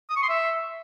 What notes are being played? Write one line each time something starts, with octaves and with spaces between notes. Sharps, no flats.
D#6
C#6
C6
E5